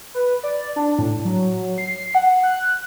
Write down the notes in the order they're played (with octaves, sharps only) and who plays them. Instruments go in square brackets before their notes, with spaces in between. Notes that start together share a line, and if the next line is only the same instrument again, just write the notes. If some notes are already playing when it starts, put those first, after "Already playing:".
[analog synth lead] B4
D5
D4
A2
F#3
C7
F#5
F#6